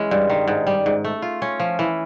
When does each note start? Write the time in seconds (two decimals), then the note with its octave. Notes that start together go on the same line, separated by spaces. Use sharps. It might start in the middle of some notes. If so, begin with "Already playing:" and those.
Already playing: E3 G#3 C#4
0.11 G2
0.30 D#3
0.48 G#2
0.67 G3
0.86 G#2
1.05 A3
1.22 F4
1.42 C#4
1.60 F3
1.79 E3